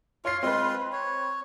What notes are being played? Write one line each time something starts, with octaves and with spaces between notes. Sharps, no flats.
F4 C#5 C7
G#3 C4 F4 B4 C6
C#5